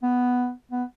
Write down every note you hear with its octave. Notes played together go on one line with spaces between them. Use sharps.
B3
B3